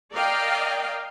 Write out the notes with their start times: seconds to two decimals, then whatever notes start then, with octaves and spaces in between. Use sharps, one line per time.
0.12 A#4 D5 D#5 F5 G5